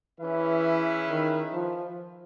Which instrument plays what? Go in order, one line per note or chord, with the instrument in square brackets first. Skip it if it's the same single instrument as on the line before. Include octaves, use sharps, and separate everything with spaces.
[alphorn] E3 [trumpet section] C#4 E4 G#4 B4 E5
[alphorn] D#3
F3